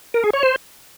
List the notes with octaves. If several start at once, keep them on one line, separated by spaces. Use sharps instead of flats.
A#4
G#4
C#5
C5